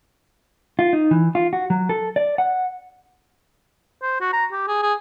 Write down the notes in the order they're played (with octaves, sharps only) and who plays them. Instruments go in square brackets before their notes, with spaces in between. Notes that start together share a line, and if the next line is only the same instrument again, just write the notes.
[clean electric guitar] F4
D#4
E3
F4
F#4
F#3
A4
D5
F#5
[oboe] C5
F#4
A#5
G4
G#4
G#4